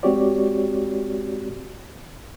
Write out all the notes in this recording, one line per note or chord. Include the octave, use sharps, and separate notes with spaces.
G#3 C4 F#4 G4 C#5 D5